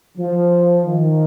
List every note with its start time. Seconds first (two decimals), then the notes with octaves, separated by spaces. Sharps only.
0.18 F3
0.86 D#3